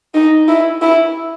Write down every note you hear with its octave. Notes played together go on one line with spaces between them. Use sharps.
D#4
E4
E4